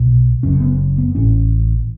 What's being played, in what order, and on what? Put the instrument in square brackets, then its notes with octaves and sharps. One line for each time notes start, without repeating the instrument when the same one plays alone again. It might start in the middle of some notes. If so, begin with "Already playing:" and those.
Already playing: [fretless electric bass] B1 B2
F#1 F#2 C#3 C#4
B3
B3
A1 A2 C#4